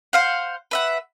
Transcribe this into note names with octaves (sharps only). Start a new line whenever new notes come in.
C5 F5 F#5
B4 E5 F#5